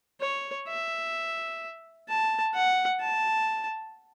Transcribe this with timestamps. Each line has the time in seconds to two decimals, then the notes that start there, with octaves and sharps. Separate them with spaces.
0.21 C#5
0.68 E5
2.08 A5
2.54 F#5
3.01 A5